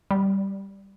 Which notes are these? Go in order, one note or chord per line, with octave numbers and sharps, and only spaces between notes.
G3